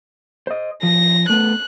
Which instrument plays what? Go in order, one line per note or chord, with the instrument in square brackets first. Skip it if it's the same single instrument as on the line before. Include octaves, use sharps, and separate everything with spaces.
[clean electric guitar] C5 D#5
[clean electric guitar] F3 [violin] A#6
[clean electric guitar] A3 B3 [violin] F#6